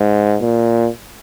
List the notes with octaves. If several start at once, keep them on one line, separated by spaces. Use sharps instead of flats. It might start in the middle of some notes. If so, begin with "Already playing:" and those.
Already playing: G#2
A#2